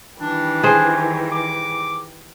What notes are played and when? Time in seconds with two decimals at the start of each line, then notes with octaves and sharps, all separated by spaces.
0.21 D#3 E3 G3 D4
0.63 G#4 C5
1.32 D6